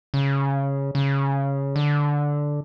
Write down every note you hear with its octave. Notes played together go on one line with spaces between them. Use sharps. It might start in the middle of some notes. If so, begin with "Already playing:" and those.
C#3
C#3
D3